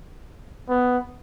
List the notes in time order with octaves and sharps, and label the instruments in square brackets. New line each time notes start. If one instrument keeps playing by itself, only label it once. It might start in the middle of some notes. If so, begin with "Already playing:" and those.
[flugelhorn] B3